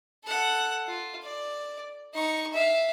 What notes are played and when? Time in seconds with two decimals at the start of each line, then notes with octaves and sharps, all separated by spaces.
0.24 A4 F#5
0.87 F4
1.23 D5
2.14 D#4 C#6
2.53 E5 F5